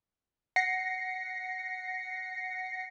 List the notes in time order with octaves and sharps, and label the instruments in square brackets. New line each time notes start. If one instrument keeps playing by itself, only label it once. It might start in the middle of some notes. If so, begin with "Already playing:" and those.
[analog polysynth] F#5 A#6 C7 C#7